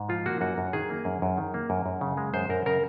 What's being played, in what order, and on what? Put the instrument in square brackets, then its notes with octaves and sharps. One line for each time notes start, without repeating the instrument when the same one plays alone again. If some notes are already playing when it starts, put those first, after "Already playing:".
Already playing: [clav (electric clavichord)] G#2
F3 F4
A#3 F#4
F#2 F#4
F#2
D#3 G#4
A#3
F#2
F#2
D#3
A#3
F#2
F#2
C#3
G#3
F#2 C5
F#2 A#4
C#3 A#4